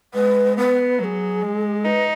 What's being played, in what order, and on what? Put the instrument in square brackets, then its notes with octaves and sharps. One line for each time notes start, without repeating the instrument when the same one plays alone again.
[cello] G#3 [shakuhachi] B4
[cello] B3 [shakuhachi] B4
[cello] F#3 [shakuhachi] B4
[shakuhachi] G#4
[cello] G#3
[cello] D#4 [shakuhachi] B4